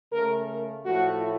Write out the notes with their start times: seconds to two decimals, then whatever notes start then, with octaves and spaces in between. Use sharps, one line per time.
0.13 C#3 A3 A#4
0.85 A2 F3 A3 F#4